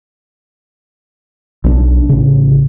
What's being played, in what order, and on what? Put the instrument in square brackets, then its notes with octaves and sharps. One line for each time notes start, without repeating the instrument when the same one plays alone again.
[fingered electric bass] B1 C#4 D4
A1 C#3